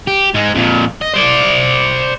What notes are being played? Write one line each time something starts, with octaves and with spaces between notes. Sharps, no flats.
G4
G#2 G#3
F2 A#2
D#5
C5 D5